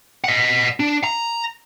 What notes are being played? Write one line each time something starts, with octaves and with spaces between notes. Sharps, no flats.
D#5 F#5
D4
A#5